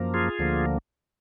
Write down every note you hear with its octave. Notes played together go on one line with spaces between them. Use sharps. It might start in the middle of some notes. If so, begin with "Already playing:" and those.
Already playing: F#2 F3 A#3
F4 G#4
D2 D3 F3 A#3